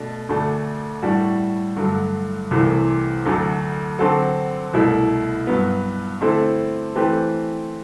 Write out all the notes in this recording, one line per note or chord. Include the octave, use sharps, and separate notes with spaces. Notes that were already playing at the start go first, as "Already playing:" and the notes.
Already playing: B2 A3 D4
D2 D3 A3 D4
A2 G3 D4 F#4
G2 D3 F#3 A3
C2 C3 E3 A3
D2 D3 F#3 A3
D3 F#3 C4 F#4 A4
C2 B2 A3 E4
G2 F#3 B3
D3 A3 C4 E4 A4
E3 A3 C4 G4 B4